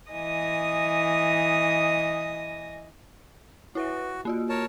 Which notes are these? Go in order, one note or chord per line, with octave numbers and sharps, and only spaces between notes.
E3 D#5 G#5 D#6 A#6
E4 F#4 B4 E5
A#3 F4 F#4
A#4 C#5 A5